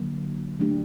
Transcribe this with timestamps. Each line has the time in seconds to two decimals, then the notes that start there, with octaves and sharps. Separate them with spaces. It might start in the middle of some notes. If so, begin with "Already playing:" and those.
Already playing: D3 F#3 A#3
0.60 F#3 A3 D4 G4